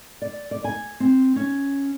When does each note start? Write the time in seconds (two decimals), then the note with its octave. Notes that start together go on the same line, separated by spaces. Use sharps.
0.22 D5
0.51 D5
0.64 G#5
1.00 C4
1.36 C#4